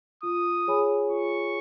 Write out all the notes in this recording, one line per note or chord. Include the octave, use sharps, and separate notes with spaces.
F4 D#6
G#4 C#5 G#5 B5
F4 C#6